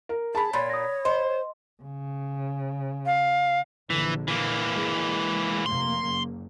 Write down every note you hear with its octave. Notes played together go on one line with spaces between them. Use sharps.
A#4
G#4 A5 B5
A#2 C#5 B5 C6 A6
D#6 A#6
C5 D#5 C6
C#3
F5
A#1 D3 E3
E3 A#3
G#3
F1 A#3 C6
F#1